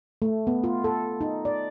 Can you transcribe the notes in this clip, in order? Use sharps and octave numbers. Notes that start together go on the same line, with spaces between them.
A3
B3
F4
A4
D#4
D5